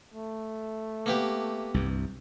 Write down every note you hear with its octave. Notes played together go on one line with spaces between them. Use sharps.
A3
A#3 B3 G4
C2 G2